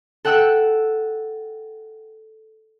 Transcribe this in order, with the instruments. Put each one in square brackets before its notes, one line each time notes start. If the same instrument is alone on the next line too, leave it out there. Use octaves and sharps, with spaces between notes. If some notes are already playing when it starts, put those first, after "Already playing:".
[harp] A4 F#5 G5 E6 F#6